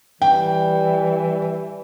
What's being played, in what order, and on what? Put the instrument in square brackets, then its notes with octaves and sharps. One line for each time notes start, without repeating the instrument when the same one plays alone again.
[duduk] E3 [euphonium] G3 [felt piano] G5